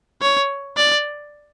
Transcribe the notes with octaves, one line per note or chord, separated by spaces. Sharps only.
C#5
D5